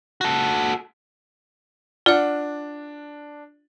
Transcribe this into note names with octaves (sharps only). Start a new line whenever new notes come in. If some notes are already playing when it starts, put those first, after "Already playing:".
F#4 A4
D4 F4 D5 F#5